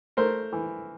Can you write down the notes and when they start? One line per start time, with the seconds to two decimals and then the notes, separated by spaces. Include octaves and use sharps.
0.17 A3 A#4 C5
0.52 E3